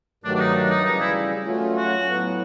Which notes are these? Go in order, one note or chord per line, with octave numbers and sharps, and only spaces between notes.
G2 D#3 F#3 A3 D4
D4
D#4
D4
D#4
C#3 E3 G3 D#4
E4
F#3 A3 C#4 F4
F#4
A2 F#3 B3